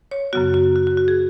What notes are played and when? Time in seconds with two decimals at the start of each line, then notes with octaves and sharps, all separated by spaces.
0.11 C#5
0.33 F#2 C#3 F#3 B3 F#4
0.54 F#4
0.76 F#4
0.87 F#4
0.97 F#4
1.08 G#4